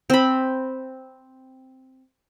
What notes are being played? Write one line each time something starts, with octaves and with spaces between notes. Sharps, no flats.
C4 B5